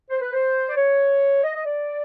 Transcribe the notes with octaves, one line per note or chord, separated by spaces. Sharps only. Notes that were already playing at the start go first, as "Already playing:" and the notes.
C5
B4
C5
D5
C#5
D#5
D#5
D5